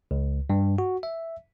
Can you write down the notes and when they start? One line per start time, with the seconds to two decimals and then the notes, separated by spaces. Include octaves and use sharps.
0.11 C#2
0.50 G2
0.78 F#4
1.03 E5